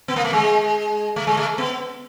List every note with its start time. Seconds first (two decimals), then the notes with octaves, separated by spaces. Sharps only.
0.08 B3
0.16 A#3
0.24 A3
0.33 G#3
1.16 A3
1.27 G#3
1.37 A3
1.58 B3